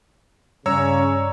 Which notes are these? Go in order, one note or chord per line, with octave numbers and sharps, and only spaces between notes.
G2 C#3 C#4 C#5 D5 A#5 E6